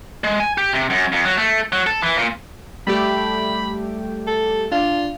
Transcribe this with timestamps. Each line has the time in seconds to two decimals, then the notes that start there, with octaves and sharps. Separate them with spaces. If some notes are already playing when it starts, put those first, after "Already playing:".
0.24 G#3
0.40 G#5
0.58 G4
0.73 C3
0.90 F#2
1.12 F2
1.25 F#3
1.37 A3
1.72 F#3
1.87 A4
2.02 E3
2.17 A#2
2.87 G3 A3 G4 B5
4.27 A4
4.72 D4 F4